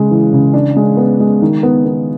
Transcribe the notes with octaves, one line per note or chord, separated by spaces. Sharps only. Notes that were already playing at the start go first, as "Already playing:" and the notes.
Already playing: C#3 G#3
E3
C#3
D4
G#3
B3
G#3
D#3
B3
B3